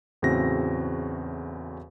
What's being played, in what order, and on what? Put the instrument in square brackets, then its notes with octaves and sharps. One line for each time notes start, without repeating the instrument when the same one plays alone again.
[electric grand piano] E2 A2 C#3 C4 F#4 A#6